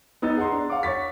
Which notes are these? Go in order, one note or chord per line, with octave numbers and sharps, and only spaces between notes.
B3 D#4 E6 A6
G#4 F#5 A#5 C6
D4
F5 F#5 D6
C#5 F#5 C#6 A6 B6